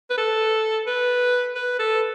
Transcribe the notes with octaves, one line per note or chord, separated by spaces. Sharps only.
B4
A4
B4
B4
A4